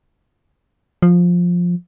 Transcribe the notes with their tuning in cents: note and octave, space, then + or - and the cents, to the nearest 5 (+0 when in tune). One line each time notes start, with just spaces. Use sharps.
F3 +10